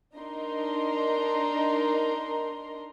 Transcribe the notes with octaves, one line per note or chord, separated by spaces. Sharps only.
D4 D#4 A#4 A#5 C6